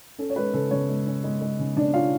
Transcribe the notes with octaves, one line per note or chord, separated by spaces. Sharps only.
C#4 A4
C#5
G#3 B4
C#3 A4
C#3 C#4 C#5
G#3
C#4
G#3
G#3
C#3
C#3 D4 D5
C#4 F4 F5